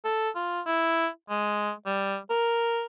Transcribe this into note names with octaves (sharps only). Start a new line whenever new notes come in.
A4
F4
E4
G#3
G3
A#4